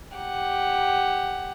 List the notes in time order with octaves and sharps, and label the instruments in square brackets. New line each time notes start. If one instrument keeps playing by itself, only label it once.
[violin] G4 F#5